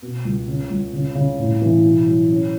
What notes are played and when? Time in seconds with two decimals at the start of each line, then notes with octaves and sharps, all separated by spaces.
0.02 B2
0.25 C#2
0.48 C#3
0.70 C#2
0.93 C#3
1.15 C#3
1.39 A2
1.62 E3
1.84 B2
2.07 F#3
2.30 C#4